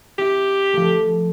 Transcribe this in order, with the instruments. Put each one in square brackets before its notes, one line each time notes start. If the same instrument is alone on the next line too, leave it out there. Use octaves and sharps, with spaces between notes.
[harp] C4 E4 [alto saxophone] G4
[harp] F3 A3